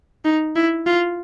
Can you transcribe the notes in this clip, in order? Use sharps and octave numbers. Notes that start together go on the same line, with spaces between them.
D#4
E4
F4